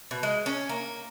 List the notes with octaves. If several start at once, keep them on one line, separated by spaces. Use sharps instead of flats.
B2
G#3
C#4
A#3